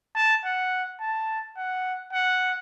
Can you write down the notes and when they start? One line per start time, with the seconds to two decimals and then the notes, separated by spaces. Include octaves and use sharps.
0.15 A5
0.45 F#5
1.00 A5
1.57 F#5
2.13 F#5